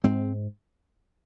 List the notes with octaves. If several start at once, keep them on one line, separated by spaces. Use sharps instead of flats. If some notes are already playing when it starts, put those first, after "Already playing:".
G#2 G#3 C4